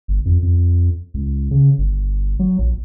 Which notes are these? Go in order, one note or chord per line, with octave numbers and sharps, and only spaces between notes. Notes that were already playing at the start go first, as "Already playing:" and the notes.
G1
F2
F2
C#2
C#3
G1
F#3
A#1